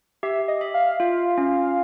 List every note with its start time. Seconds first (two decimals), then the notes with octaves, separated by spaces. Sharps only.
0.23 G4 E5
0.48 D#5
0.61 E5
0.74 F5
1.00 F4
1.38 C#4